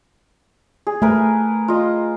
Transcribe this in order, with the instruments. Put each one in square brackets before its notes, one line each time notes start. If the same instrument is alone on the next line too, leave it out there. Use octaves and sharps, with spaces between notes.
[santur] G#4
[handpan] A3 [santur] A#4 B4 G#5
[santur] F4 D#5